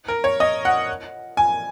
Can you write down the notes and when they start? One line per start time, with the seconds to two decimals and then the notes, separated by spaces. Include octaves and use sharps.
0.08 A#4
0.24 C#5
0.40 D#5
0.65 F#5
1.37 G#5